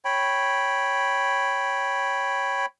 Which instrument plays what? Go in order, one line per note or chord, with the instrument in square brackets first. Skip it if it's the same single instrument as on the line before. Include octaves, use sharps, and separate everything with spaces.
[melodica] C#5 G5 B5